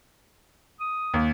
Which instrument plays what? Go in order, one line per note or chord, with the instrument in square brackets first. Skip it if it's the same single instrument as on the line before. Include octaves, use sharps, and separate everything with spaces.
[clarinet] D#6
[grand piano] D#2